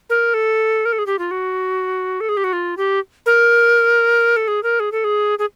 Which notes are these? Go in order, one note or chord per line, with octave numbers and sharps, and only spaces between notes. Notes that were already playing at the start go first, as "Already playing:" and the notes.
A#4
A4
A#4
A4
G#4
G4
F4
F#4
A4
G#4
G4
F#4
F4
G4
A#4
A4
G#4
A#4
G#4
A4
G#4
G#4